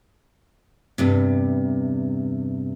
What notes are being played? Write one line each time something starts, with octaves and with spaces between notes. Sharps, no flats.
E2 G2 C3